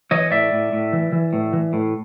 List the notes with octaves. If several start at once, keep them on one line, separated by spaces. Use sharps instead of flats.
E3 C#5 D#5
A2 D5 E5
A2
A2
E3
E3
A2
E3
A2